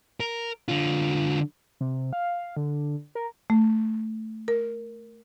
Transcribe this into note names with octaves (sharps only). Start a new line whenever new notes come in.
A#4
D3 F4
C3
F5
D3
A#4
A3
A#4